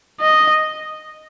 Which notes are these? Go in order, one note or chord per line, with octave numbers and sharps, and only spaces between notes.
D#5